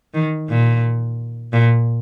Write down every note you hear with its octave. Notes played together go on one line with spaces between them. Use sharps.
D#3
A#2
A#2